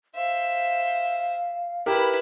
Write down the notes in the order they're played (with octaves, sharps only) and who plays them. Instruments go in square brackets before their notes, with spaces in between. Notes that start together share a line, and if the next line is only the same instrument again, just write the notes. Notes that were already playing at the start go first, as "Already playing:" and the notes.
[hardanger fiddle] C5 E5 [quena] F5
[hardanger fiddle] E4 B4 [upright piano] G4 A#4